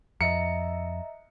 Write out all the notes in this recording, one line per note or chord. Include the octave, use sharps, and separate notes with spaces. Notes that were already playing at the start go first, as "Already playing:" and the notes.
F2 D#5 E5 A#5 C#7